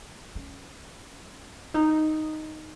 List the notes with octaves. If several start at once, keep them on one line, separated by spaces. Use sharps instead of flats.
C#4
D#4